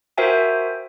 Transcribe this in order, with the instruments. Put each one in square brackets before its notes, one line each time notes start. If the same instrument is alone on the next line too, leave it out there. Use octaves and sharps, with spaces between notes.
[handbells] F#4 A#4 C5 E5 G5 G#5